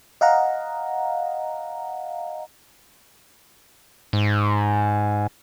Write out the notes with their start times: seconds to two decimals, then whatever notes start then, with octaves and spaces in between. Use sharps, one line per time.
0.21 D#5 F5 F#5 A#5
4.13 G#2